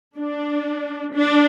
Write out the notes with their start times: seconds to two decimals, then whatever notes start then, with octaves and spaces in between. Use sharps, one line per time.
0.18 D4
1.14 D4